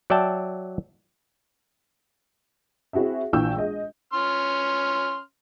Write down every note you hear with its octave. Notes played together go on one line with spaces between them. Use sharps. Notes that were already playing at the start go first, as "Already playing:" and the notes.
F#3 D5 E5 G5 A5
C4 E4 F#4 G#4 E5
A#1 E3 G5 C#6 E6 G6
G#3 D#5
C#4 C6 F6